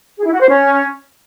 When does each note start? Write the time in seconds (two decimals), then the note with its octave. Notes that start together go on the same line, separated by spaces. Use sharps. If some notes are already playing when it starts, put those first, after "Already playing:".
0.17 G#4
0.25 E4
0.32 F#4
0.40 C5
0.48 C#4